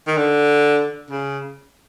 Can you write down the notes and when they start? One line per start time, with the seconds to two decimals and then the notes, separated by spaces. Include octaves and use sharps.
0.07 D#3
0.18 D3
1.11 C#3